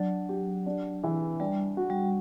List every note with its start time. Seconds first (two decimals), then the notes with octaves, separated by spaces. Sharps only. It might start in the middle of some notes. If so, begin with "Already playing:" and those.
Already playing: F#3 D4
0.29 G4
0.66 D4
1.03 E3
1.40 G3 D4
1.77 F#4
1.90 G3